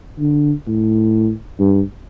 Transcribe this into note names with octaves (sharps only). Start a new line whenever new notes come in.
D3
A2
G2